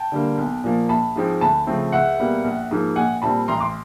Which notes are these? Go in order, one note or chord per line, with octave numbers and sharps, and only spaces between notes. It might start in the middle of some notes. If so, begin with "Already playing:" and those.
Already playing: G5 A5
D3 G3 A#3
B1
A#2 F3 A#3
A#1 A5 B5
G#2 F3 G#3 C4
D2 A5 B5
C#3 F3 A3 C4
C#2 E5 F#5
B2 G3 A#3
A#1
G#2 F3 A#3
A#1 F#5 G#5
A#2 G3 C4 A5 B5
A1 A#5 C6
C6 D6